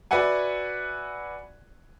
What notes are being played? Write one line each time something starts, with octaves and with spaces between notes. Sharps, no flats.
F#4 B4 D5 E5 F#5 G#5